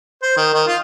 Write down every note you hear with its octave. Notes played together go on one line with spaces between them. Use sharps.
C5
D#3
D#3
F4